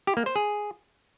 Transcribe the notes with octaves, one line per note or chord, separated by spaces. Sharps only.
G4
A#3
C5
G#4